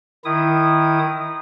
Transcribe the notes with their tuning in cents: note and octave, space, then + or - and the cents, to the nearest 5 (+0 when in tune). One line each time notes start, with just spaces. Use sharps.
D#3 +0 E4 +0 D#6 -15